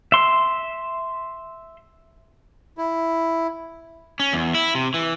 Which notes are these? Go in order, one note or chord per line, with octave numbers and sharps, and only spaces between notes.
E5 C6
E4
C#4
E2
E4
C3
E3